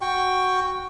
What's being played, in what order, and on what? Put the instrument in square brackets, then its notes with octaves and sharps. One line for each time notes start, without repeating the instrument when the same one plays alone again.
[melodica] F#4 G5 C#6